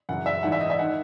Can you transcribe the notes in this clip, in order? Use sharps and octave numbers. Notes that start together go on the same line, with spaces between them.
F#2 C#3 E3 F#5
E5
G#2 E3 F#5
E5
D#5
E5
D#3 F#5